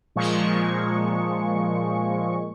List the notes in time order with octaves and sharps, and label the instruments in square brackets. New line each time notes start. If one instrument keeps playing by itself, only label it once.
[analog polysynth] A#2 F3 G#3 C#6